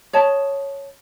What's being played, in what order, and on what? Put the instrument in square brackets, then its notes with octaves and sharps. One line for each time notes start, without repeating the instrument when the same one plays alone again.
[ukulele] C#5 D#5 A5